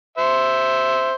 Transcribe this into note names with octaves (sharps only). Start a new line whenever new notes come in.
C5 E5